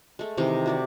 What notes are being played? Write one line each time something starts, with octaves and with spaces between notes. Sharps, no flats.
G#3 A3
C3 D#3 E3 D#5
F#4 G4 D5